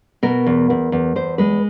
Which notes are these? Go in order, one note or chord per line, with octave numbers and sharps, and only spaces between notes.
B2 A#4
E2
E2
E2
E2 C5
G#3 B4